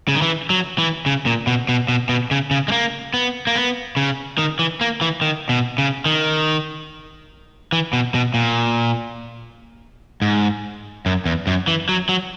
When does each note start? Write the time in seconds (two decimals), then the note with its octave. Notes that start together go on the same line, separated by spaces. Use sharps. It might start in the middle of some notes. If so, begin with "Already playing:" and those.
0.08 C#3
0.15 D#3
0.22 E3
0.50 F#3
0.78 E3
1.06 C#3
1.26 A#2
1.47 B2
1.69 B2
1.89 B2
2.09 B2
2.31 C#3
2.51 C#3
2.68 G#3
2.72 A#3
3.14 B3
3.47 A#3
3.56 B3
3.97 C#3
4.38 D#3
4.59 E3
4.81 A#3
5.01 E3
5.22 D#3
5.49 B2
5.78 C#3
6.06 D#3
7.72 E3
7.93 B2
8.14 B2
8.34 A#2
10.22 G#2
11.06 F#2
11.26 E2
11.47 F#2
11.68 E3
11.89 F#3
12.09 F#3